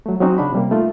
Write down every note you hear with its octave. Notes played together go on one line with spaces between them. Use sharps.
F#3 A3
F#3 C4 C#4 D#4 F#4
C#3 D4 B5
C3 G3 A#3
A3 D#4 F4